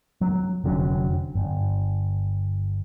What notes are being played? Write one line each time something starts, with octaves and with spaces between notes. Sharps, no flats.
F#3
F1 D3 F#3 C#4
G1